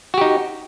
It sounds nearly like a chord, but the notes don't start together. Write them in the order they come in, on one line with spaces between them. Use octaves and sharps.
F#4 G4 D#4